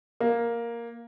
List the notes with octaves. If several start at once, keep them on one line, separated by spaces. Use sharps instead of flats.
A#3